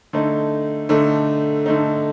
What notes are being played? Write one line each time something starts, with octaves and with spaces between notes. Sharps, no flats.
D3 A3 D#4
D3 A3 D#4
D3 A3 D#4